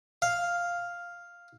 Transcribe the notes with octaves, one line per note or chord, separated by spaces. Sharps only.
F5